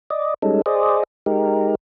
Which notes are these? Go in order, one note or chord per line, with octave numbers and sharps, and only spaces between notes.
D5 D#5
G3 G#3 C#4 D#4 A4
G#4 C5 D5 D#5
G#3 D#4 G4 A#4